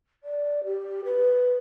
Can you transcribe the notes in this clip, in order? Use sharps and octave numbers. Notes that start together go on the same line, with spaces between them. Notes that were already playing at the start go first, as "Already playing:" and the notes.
D5
G4
B4